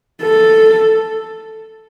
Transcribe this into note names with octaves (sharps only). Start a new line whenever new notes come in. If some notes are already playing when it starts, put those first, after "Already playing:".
A4